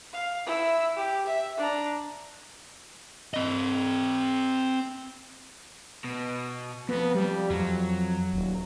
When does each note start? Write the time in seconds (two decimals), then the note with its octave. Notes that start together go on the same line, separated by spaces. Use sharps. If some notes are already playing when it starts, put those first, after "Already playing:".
0.13 F5
0.46 E4 E6
0.97 G4
1.26 E5
1.57 D4 A#5
3.34 C4 D#5
6.04 B2
6.89 F2 B3
7.15 G3
7.50 F2 F#3
8.33 D#1